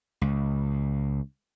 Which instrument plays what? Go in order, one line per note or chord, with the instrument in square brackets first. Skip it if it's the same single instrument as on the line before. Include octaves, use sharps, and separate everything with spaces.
[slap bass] C#2